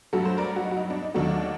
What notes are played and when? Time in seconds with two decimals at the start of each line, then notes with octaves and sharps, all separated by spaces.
0.13 G2 F#3 A3 F#4 A4
0.25 A4 C5
0.38 A#4 D5
0.56 F#4
0.64 D#4
0.71 F#4
0.76 D#4
0.90 D4
1.02 D#4
1.14 D#2 D#3 F#3 A3 D4 F#4